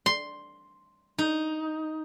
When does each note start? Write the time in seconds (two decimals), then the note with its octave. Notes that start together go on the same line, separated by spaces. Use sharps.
0.06 C6
1.18 D#4